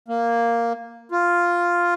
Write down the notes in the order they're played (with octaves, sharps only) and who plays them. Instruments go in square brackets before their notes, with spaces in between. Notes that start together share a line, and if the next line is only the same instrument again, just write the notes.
[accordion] A#3
F4